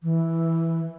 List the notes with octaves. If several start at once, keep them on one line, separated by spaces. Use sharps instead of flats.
E3